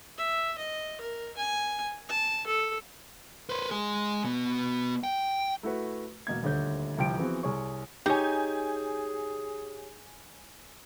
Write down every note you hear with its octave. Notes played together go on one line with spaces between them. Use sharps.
E5
D#5
A#4
G#5
A5
A4
B4 C5
G#3 G#4
B2 B3
G5
A3 E4 F#4 B4
E1 B2 A#3 G#6
D#1 D2 D3 C#5 G6
G1 C2 F3 G4 G5 D7
E3 F3 B3 C4 F#4 G#4
C2 G#4 C#5 C#6
D#4 G4 G#4 C#5 G#5 G6